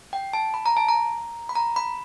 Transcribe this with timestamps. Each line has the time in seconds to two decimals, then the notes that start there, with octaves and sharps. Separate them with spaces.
0.13 G5
0.33 A5
0.54 B5
0.66 A#5
0.77 A5
0.88 A#5
1.49 B5
1.55 A#5
1.76 B5